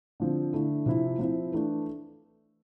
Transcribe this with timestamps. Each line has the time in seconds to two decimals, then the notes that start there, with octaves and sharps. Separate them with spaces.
0.20 D3 F3 C4
0.53 D3 A3 E4
0.86 C3 F3 C4 E4
1.19 F3 C4 E4
1.52 E3 A3 D4